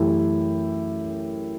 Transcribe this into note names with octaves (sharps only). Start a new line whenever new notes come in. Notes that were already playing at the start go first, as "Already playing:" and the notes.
Already playing: F#2 E3 A3 E4 G4